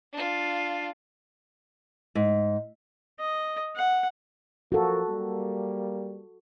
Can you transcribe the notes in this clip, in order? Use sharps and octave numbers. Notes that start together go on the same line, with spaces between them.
D4 F4
G#2
D#5
F#5
F3 A#3 F#4 A4
G3 A#3